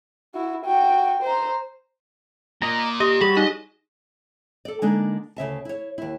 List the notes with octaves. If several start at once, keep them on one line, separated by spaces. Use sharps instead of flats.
E4 F#4
F#4 G5
C5 A#5
A#2 D#5 A#5
G4 D#5
F#3 G3 G#4 B5
D#4 D#5
A4 D5
D3 G#3 A#3 D4 D#4
D2 C#3 E5 A5
E4 C#5
D#2 E4